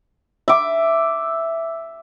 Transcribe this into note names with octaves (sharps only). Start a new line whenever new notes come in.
E5 D6